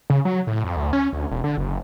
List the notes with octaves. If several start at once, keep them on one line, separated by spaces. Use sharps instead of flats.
C#3
F#3
A2
F2
D2
C#4
D2
E1
D3
F#1